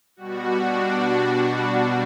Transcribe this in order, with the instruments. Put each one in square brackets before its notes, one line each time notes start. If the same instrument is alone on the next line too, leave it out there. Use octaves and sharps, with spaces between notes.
[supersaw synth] B2 G3 F#4
D4